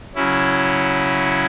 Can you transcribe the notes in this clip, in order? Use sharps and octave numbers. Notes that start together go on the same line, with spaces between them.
C#3 F#3 C#4 E4